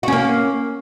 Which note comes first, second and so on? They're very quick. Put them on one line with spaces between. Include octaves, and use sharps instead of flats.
F#4 C#4 A#3